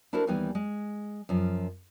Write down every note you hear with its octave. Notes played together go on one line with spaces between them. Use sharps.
D4 E4 F#4 A4 A#4 C5
D#2 E3 G3 B3 D#4 G#5
G#3
F#2 F3